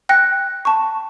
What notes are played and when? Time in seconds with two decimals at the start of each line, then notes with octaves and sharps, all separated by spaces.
0.09 G5 F#6 A#6 C#7
0.65 A5 C#6